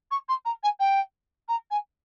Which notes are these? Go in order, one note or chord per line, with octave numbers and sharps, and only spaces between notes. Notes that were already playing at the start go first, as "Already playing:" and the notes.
C#6
C6
A#5
G#5
G5
A#5
G#5